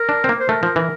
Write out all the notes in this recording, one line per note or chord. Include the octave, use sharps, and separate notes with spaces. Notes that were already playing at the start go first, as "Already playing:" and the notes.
Already playing: A#4
D4
C4
A#3
C5
A3 A#4
F3
E3